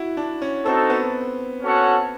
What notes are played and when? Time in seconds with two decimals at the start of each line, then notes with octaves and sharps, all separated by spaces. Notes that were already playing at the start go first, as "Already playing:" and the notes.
Already playing: E4 F#4
0.17 D4
0.42 C#4
0.66 C4 D#4 F#4 A4
0.90 B3
1.62 C#4 F#4 A4 C#5 F#5